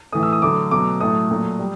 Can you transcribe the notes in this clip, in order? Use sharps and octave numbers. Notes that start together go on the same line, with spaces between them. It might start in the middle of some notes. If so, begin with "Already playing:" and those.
A2 E3 A3 D#6
E6
D#6
D3 F#3 A3 D6
B2 F#3 A3 D6
A2 F#3 A3 D#6
A#2 F#3 A3
G3